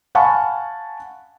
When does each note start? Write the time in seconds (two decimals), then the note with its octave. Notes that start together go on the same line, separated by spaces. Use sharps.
0.15 F5 F#5 G#5 A5 B5 C#6